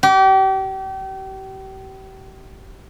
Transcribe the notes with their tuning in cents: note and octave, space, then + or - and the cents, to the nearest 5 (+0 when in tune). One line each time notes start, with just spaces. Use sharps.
G4 -35